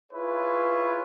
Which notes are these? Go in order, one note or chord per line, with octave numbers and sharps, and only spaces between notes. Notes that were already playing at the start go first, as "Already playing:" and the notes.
E4 F4 G#4 B4 C#5